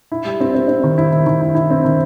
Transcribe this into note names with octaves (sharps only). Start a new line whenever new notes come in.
E4
G3
C4
C4
C4
D#3
E4
D#3
D#3
E4
E4
C4
D#3